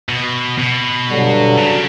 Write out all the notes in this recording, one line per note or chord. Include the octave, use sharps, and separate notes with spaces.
B2
B2
G2 D3 F#3
C#3